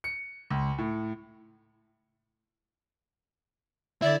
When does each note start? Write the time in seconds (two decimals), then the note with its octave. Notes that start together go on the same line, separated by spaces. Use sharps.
0.04 C#7
0.51 C#2
0.78 A2
4.02 D3 E4 D5 E5